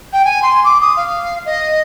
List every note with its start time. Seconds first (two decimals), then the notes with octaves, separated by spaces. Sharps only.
0.13 G5
0.25 G#5
0.42 C6
0.64 D6
0.81 D#6
0.97 F5
1.46 D#5